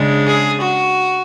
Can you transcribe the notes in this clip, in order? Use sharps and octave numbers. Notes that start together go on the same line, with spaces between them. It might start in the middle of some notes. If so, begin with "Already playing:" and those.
Already playing: C#3 G#3 D4
G#4
F#4